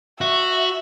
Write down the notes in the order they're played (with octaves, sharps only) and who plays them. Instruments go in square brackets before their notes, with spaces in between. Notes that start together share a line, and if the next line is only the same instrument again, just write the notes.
[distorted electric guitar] F#4 [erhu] E5